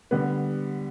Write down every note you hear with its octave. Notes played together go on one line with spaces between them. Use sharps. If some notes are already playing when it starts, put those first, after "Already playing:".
D3 G3 B3